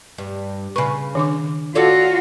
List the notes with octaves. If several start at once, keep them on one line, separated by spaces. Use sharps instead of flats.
G2
C#3 B4 B5 C#6
D#3 D4 D6
F4 F#4 A4 C#5 D5